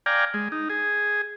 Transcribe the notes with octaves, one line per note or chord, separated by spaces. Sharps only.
D5 F5 G5 G#5 A#5
G#3
D#4
G#4